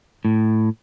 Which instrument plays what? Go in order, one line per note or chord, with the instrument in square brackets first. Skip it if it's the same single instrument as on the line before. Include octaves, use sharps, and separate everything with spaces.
[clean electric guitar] A2